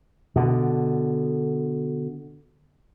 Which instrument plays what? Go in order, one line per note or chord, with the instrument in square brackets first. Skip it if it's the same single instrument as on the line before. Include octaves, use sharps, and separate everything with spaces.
[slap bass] B2 D3